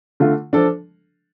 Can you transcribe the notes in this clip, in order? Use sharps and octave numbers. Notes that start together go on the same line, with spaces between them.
D3 A3 F4
F3 D4 A4